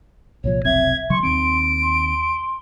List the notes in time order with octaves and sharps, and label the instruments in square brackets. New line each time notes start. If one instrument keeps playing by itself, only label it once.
[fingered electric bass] C2 A#2 F3 [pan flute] C#5
[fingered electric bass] F1 B1 C4 [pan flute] E5 [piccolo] G#6
[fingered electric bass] C#3 F#3 [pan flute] C6 [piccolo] C#6
[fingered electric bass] D#2 D#3 C4 [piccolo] D7
[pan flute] C6